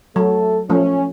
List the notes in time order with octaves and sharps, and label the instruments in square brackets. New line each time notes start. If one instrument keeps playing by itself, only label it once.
[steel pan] F#3 [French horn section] A3 A4
[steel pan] F3 A3 [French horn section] C#4